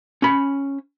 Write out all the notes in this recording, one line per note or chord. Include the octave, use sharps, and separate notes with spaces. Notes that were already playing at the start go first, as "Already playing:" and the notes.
C#4 B5